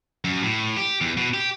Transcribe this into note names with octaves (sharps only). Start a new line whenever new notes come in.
F#2
A2
G4
E2
B2
G4